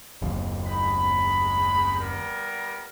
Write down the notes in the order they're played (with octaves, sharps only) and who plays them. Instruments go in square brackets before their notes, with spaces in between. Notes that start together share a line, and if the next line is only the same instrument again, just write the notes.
[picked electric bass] F#1 D#2
[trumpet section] G#3 D#4 B5
G3 B3 A#4